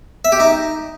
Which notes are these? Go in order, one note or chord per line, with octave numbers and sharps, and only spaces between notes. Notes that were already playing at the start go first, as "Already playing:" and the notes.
E5
G4
D#4